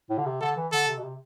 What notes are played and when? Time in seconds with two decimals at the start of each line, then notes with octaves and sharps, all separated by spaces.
0.10 A2
0.18 D3
0.26 C3
0.41 D3 A4
0.57 E3
0.72 D3 A4
0.88 C3
0.98 B2
1.03 C3